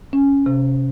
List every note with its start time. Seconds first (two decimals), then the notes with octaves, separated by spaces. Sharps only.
0.13 C#4
0.46 C3